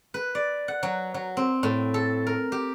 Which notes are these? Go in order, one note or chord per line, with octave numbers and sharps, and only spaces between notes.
B4
D5
F#5
F#3
F#3
C4
A2
A4
A#4
G4